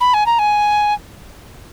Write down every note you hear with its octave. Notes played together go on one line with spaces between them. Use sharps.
B5
G#5
A#5
G#5